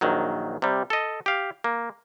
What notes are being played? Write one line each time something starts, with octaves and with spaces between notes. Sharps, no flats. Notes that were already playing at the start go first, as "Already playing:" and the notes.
A#1 D#3 F#3
C3 G3
A4 D#5
G4 F5
A#3